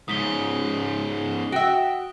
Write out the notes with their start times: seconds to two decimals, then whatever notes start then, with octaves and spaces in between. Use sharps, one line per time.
0.08 G#2 C#3 D#6 B6 G7
1.52 F#4 E5 G5